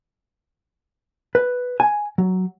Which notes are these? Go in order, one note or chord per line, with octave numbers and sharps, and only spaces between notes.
B4
G#5
F#3